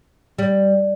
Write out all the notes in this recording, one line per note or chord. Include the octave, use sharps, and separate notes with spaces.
G3